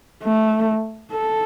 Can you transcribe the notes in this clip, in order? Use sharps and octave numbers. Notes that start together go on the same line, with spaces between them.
A3
A4